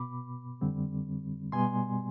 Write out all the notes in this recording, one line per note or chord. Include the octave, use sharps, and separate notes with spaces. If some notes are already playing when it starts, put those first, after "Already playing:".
Already playing: B2 B3 B5 D6
F2 D3 G3 C4
B2 G3 B3 G#5 C6